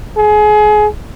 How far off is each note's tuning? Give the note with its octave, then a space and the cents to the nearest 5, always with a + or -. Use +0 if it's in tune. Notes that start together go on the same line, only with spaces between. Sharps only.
G#4 +25